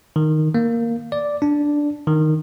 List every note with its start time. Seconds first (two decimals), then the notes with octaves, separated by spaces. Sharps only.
0.16 D#3
0.54 A#3
1.12 D5
1.42 D4
2.07 D#3